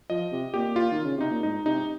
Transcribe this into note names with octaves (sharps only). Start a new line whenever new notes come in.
F3 D#5
C3
A#2 G4
F4
D#3
C#3
C3 D#4
A#2
G#2 D#4
C3 D#4